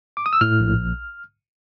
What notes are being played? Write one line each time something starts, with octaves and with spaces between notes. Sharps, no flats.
D6
D#6
E6
A2 F6
A#1